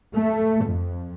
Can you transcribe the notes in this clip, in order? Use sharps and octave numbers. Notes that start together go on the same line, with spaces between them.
A3
F2